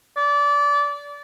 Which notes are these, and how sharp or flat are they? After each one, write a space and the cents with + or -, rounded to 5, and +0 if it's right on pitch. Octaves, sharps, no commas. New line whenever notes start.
D5 -25